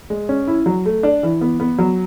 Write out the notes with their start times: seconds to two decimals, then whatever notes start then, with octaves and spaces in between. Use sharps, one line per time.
0.10 G#3
0.29 C#4
0.48 E4
0.66 F#3
0.86 A3
1.03 D4
1.23 E3
1.41 B3
1.60 B3
1.78 F#3